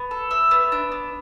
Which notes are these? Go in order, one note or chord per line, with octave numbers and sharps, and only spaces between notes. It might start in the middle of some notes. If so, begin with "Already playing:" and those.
Already playing: B3
A4
E5
B3
D4
B3